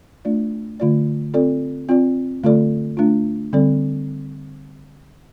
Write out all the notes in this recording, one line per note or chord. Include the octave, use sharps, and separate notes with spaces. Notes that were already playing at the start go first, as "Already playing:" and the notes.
A3 D4 F4 D5
D3 A3 F4 D5
C4 F4 A4 D5
C4 F4 D5
D3 A3 F4 A4 D5
A3 D4 F4
D3 G3 C4 A4 D5